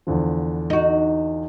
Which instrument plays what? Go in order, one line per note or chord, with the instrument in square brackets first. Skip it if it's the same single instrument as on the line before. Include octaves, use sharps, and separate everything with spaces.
[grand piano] E2 D3 F3
[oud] D#4 F#4